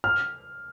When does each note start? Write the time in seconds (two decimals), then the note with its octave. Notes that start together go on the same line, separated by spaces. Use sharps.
0.04 F6